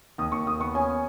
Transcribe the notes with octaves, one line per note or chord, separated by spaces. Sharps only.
D#2 D#6
D#2 C#6
D#2 D#6
B3 C#6
C#4 G#5